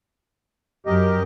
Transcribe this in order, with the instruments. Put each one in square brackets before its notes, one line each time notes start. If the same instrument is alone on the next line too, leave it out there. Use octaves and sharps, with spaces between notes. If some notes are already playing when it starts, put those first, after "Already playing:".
[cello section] F#2 [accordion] G4 A#4 D#5